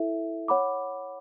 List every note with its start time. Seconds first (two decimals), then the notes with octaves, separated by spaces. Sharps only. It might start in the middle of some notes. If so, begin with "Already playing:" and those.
Already playing: E4 A4 E5
0.48 C#5 F#5 B5 D6